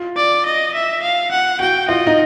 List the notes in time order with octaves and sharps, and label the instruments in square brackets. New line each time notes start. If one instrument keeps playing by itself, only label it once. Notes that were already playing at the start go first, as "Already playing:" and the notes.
Already playing: [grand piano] F4
[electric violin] D5
D#5
E5
F5
F#5
[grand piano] F#4 [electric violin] G5
[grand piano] F4 [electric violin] D#5
[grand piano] D#4